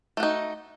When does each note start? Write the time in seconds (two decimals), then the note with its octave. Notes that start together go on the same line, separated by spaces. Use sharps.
0.17 A3
0.20 F#4
0.23 D#4